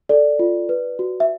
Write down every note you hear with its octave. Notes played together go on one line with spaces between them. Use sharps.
A4 D5
F4
B4
F#4
E5